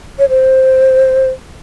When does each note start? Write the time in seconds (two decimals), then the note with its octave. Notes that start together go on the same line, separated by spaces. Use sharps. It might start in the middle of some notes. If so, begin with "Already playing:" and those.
0.19 C#5
0.29 C5